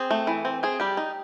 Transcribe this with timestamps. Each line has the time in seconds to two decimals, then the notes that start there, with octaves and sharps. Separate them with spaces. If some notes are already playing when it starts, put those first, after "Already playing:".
Already playing: C4 G#4
0.11 A3
0.27 E3
0.45 C4
0.63 C4 G#4
0.80 G3 G4
0.97 D#4